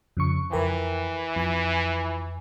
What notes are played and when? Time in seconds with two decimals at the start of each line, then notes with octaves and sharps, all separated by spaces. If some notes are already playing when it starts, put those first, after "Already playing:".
0.17 F2 C#3 C#6
0.52 F2 E3 A#4 G5
1.36 F2 G#5